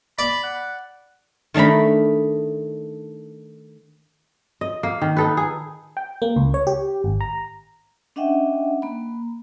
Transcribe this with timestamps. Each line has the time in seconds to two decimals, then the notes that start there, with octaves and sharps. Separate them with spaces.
0.19 D5 B5 D6
0.43 F#5
1.54 D#3 A3 D4 A#5 B5
4.61 D#5
4.83 A#3
5.01 D#3
5.17 D#4 A4 B4
5.37 G#4
5.97 G5
6.22 A#3
6.36 C#2
6.54 C#5
6.67 G4
7.04 G#1
7.21 A#5
8.16 C#4 D4 D#5 E5 F#5 G5
8.82 A#3 B5